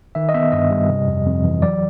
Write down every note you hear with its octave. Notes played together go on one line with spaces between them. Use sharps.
D#3 E5
D#5
B3 E5
G2 D#5
G3
C3
F2
F2
E3
F#3 D5